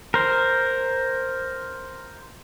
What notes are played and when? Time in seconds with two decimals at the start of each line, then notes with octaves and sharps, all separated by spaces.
0.14 A#4 C5